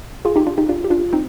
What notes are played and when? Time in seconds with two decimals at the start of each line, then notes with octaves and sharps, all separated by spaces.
0.25 F4 G#4
0.36 D#4 G4
0.47 D4 F4
0.58 D#4 G4
0.69 D4 F4
0.84 G4
0.90 D4 F4
1.13 C4 D#4